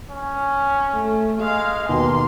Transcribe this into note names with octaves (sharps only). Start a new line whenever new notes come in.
C#4
A3
G#3 F5
D#2 B2 A#3 C6